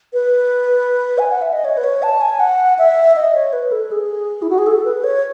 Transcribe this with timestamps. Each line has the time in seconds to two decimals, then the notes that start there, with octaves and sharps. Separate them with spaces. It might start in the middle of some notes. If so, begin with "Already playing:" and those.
0.13 B4
1.18 G#5
1.31 F#5
1.42 E5
1.53 D#5
1.65 C#5
1.77 B4
1.84 C#5
2.03 A5
2.21 G#5
2.40 F#5
2.78 E5
3.16 D#5
3.35 C#5
3.53 B4
3.72 A4
3.91 G#4
4.42 E4
4.50 F#4
4.58 G#4
4.67 A4
4.85 B4
5.04 C#5